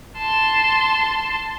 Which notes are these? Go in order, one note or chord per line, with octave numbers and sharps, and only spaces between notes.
A5 C6